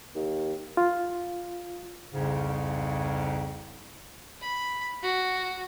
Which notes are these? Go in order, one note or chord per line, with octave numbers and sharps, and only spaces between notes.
D#2
F4
C2 F2 G#2 C#3
B5
F#4